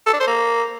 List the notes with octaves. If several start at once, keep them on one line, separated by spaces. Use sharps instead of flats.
A4
D4
C5
A#3